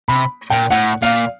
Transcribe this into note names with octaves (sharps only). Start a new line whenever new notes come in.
C3 B5
A#2 G5
A2 F#5
A#2 F5